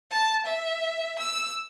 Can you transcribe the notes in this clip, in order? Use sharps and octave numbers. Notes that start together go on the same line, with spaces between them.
A5
E5
E6